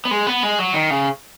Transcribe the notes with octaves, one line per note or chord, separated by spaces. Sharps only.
B3
G#3
B3
G#3
F#3
D#3
C#3